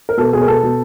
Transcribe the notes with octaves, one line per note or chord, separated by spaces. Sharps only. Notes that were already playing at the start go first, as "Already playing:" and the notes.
A#4
B2 A4
B2 G#4
A#4
B2 A4
B2